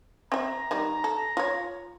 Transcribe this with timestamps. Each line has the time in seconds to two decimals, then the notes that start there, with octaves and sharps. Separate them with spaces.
0.32 C4 E5 A#5
0.71 D#3 G3 D#4
1.04 A4
1.37 F4 C#5